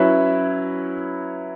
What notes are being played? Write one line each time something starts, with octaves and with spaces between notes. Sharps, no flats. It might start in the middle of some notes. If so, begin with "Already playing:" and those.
Already playing: F#3 C#4 E4 B4 E5